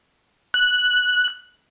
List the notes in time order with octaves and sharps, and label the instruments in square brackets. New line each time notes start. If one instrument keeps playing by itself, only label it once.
[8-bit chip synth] F#6